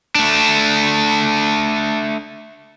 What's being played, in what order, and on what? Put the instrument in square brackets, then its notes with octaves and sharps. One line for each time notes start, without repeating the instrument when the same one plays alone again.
[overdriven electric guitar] A3 D4